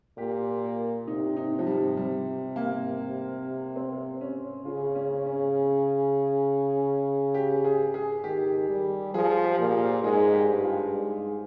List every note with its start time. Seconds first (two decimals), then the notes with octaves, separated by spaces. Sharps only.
0.17 A#2 G4
1.07 C3 D#4
1.36 D#4
1.59 F3
1.66 G3
1.97 G3
2.56 A#3
3.76 C4
4.21 C#4
4.65 C#3 F4
4.95 C#4
5.25 C#4
7.34 G4
7.64 G#4
7.94 G#4
8.24 D#3 G4
8.69 G3
9.14 F3 G#4
9.44 G4
9.59 A#2
9.73 F4
10.03 G#2 G#4
10.33 G4
10.49 G2
10.63 F4
10.93 G#2